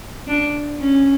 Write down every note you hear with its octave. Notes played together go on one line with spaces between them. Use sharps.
D4
C#4